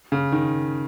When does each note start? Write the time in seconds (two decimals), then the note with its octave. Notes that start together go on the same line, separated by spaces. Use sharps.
0.12 C#3
0.32 D#3